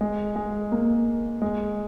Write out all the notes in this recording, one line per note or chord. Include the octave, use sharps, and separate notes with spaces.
G#3
G#3
A#3
G#3